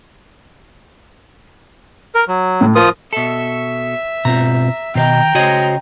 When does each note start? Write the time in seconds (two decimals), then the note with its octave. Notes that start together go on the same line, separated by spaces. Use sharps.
2.15 A#4
2.28 F#3
2.61 A2
2.76 F3 F4 A#4 D#6
3.13 B2 A4 E5
4.25 B2 C4 F4 A#5
4.95 B2 D#3 C5 D#5 G5 A#5
5.35 C#3 F#4 C5 C#5 D#5